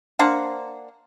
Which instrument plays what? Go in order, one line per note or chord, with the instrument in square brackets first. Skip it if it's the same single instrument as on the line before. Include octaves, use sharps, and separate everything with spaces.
[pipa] A#3 D4 C5 F#5